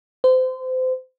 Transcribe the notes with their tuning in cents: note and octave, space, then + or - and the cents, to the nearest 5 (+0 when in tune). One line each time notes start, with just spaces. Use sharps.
C5 -30